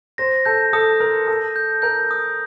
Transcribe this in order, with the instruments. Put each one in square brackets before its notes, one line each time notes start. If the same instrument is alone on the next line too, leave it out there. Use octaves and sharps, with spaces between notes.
[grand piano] C5 [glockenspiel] A#6
[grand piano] A4 [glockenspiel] G6
[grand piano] A4 [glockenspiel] D#6
[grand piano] A#4 [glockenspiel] D#6
[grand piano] A4 [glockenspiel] D#6
[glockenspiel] G6
[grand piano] A#4 [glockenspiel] G6
[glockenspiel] D#6